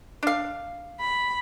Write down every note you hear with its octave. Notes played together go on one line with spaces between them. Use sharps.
D4 F5
B5